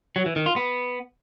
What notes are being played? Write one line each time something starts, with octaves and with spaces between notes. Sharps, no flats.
F#3
E3
D#3
F4
B3